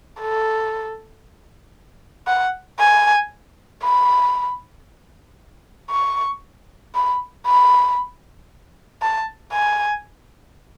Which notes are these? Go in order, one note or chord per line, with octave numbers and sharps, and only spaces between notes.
A4
F#5
G#5
B5
C#6
B5
B5
A5
G#5